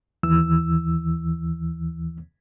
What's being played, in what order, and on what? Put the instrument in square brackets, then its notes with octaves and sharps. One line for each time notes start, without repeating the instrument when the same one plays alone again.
[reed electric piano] D#2 E3 E6